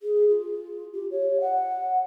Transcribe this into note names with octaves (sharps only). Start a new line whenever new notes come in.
G#4
F4
G4
C#5
F#5